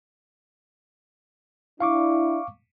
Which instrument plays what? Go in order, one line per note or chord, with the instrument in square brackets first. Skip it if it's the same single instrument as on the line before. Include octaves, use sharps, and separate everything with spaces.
[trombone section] D4 E4 [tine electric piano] F5 C#6 D6